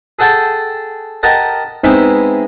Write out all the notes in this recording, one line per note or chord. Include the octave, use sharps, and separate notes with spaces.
G#4 A4 F#5 G5 A5
G4 A#4 D#5 F#5 A5
G#3 B3 C4 D#4 E4